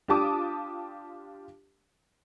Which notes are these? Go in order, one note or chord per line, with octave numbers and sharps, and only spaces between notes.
D4 F4 G4 A5 D6 D#6